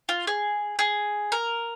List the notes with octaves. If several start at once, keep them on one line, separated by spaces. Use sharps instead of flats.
F4
G#4
G#4
A#4